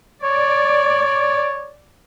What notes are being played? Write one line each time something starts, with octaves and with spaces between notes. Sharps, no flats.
C#5 D5